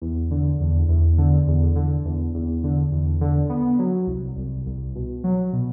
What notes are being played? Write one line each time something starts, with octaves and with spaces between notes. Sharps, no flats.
E2
D3
E2
E2
D3
E2
D3
E2
E2
D3
E2
D3
B3
F#3
C2
C2
C2
B2
F#3
B2